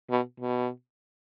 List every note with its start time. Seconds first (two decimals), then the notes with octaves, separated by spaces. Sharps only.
0.10 B2
0.40 B2